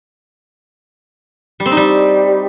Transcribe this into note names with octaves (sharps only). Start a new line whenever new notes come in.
G3
C4
D#4
G3